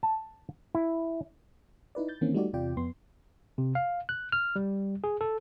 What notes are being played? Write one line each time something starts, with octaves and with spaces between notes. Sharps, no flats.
A5
E4
D#4 E4 B4 D5
G6 A6
D#3 E3 A#3 C4 C#4
G3 A3 D#4 F#4 G4 D5
E2 C3 F4 D5 G5
F2 B3 C6
C3
F5
F#6
F6
G3
G#4
A4